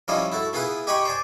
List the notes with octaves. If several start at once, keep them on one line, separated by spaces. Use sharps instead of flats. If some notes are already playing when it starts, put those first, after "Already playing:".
F3 G3 C#4 E4 F4 D#5
E4 F#4 A4
B3 E4 F4 G#4 B4
G4 D#5 G5 G#5 B5 C#6
C5 D5 G#5